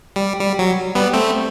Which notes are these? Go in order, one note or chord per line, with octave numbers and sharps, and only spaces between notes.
G3
G3
F#3
G3 B3
A3 C4